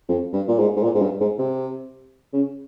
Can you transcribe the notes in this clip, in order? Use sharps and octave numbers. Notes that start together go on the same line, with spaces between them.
F2
G2
A#2
G#2
G#2
A#2
G#2
G2
G#2
C3
C#3